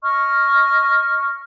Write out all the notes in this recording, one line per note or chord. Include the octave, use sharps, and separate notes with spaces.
D#5 C#6 F6